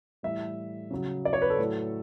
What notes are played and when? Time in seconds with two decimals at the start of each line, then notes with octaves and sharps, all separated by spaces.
0.23 A2 E3 G3 E5
0.91 C#3 F#3
1.25 D5
1.33 C#5
1.42 B4
1.50 A4
1.59 A2 F#3